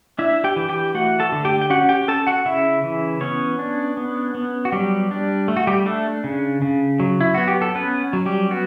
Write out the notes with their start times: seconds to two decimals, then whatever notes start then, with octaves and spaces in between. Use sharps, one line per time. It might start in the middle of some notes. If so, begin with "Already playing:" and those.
0.19 D4 E4 E5
0.44 G4 G5
0.56 E3
0.69 G4 G5
0.95 A3 F#4 F#5
1.20 A4 A5
1.32 D3
1.45 G4 G5
1.61 G5
1.70 C#4 F#4 F#5
1.89 G4 G5
2.08 C#4 A4 A5
2.27 F#4 F#5
2.45 C#3 E4 E5
2.83 E3
3.21 B3 C#4 C#5
3.59 D4
3.97 B3
4.35 B3
4.65 F#4
4.72 F#3 G3 G4
5.11 D4
5.48 A3
5.57 F#4
5.67 G3 G4
5.86 A3 D4 A4
6.24 C#3
6.62 C#3
7.00 F#3
7.21 E4
7.34 B3 F#4
7.48 G4
7.62 A4
7.75 B3 C#4 B4
8.13 F#3
8.26 G3 G4
8.51 B3 F#4